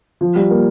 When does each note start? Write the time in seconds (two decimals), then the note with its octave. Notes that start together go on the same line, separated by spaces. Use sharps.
0.21 F3
0.36 G3
0.50 A#3